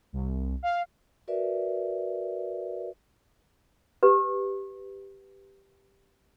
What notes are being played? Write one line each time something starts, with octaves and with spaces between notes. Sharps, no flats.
C2
F5
F#4 A#4 B4 D5 E5
G4 B4